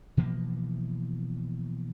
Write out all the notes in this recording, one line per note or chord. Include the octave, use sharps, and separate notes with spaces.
B2 E3 F3 A#3